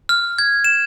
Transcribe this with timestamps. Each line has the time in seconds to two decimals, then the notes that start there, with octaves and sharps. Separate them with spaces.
0.09 F6
0.39 G#6
0.64 E7